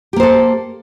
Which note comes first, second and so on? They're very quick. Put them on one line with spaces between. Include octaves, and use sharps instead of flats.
G4 A#3 C5 A4